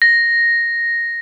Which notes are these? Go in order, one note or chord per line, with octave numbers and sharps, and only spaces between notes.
A#6